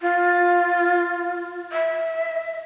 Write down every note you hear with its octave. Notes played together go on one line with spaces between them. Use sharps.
F4
E5